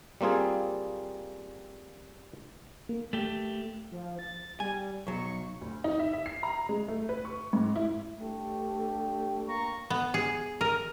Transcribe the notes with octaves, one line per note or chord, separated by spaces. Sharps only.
G3 A#3 C4 F4 G#4
A#3
A3 G4
F3
A6
G3 G#5
B1 F#3 C#6
D2
D#4
E5
E5
C7
A#5
G#3
A3
B4
C#6
G#2
E4
G2 A3 G4
A#3 A#5 C#6
B3
G#4
A#4